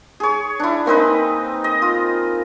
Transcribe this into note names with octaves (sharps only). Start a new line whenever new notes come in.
G#4 C#5
D4 E4
A#3 C4 D#4 B4
D#5
F4